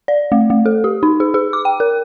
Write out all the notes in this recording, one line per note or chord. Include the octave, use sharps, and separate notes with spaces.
D5
A3
A3
A4
G4
D#4
G#4
G#4
D6
G5
A#4